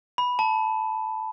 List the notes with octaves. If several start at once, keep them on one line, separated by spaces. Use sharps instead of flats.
B5
A5